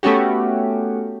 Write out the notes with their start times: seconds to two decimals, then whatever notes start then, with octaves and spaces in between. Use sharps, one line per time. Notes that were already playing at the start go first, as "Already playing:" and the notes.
0.03 A3 B3 C#4 F#4 G4